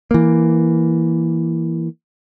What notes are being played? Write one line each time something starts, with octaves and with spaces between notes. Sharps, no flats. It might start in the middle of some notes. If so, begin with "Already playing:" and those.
E3 A#3